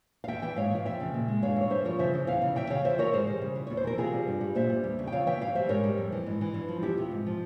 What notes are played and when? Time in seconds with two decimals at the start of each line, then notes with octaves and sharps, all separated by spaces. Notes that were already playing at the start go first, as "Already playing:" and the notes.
0.24 F5
0.28 E2 E5 G5
0.42 E3 E5 G5
0.56 G#2 C#5 F5
0.71 E3 F5
0.85 F2 E5 G5
1.00 C#3
1.14 A#2
1.28 G#3
1.42 G2 C#5 F5
1.56 E3 C#5
1.70 G2 C5 E5
1.85 F3 A#4 C#5
1.99 C#3 C5 E5
2.14 E3
2.27 E2 C#5 F5
2.42 C#3
2.56 F2 E5 G5
2.70 C#3 C#5 F5
2.85 F2 C5 E5
2.98 E3 A#4 C#5
3.13 G#2 G#4 C5
3.27 G3
3.41 C#3
3.55 E3
3.67 E2 C#5
3.77 C5
3.84 E3 A#4
3.98 C3 F4 G#4
4.13 G3
4.28 G2
4.41 G3
4.55 A#2 C5 E5
4.70 G3
4.84 E2
4.99 C#3
5.07 G5
5.12 F2 C#5 F5
5.27 E3 E5 G5
5.41 G2 C#5 F5
5.55 G3 C5 E5
5.69 G#2 A#4 C#5
5.84 G3
5.98 F2
6.12 E3
6.26 G#2
6.41 E3
6.54 G2
6.68 F3
6.82 E2 E4 G4
6.97 C3 F4
7.11 G#2
7.27 F3